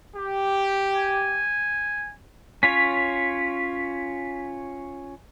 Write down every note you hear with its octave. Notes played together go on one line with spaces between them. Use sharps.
G4
G#5
C#4 F4 C#5 B6